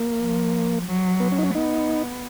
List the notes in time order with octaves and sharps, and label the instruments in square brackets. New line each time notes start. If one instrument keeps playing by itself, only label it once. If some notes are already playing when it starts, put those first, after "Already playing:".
Already playing: [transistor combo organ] A#3
[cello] F3
F#3
[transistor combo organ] B3
C#4
D#4
C#4
[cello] B3 [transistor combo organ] D#4